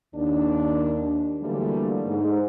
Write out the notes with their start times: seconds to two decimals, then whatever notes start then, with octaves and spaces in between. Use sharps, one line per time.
0.15 D#2 D4
1.42 D3 E3 F#3 G3 A3 A#3
2.06 G#2